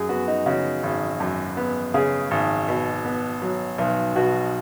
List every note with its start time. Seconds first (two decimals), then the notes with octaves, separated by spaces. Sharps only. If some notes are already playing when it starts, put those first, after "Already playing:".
Already playing: F#2 G#4
0.09 B3 F#4
0.28 D#4
0.46 C#3 F#4
0.83 G#1
1.20 F#2
1.57 B3
1.94 C#3 G#4
2.31 G#1
2.68 B2
3.05 B3
3.42 F#3
3.78 B1
4.16 B2 F#4